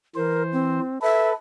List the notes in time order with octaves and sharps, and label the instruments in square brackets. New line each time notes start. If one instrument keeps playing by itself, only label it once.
[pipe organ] E3 C5 [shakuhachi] A#4
[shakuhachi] C4
[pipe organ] A4 B4 [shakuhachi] E5